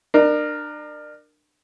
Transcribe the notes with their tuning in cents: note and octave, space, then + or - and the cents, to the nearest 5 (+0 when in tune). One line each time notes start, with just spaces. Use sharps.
D4 +35 A#4 +0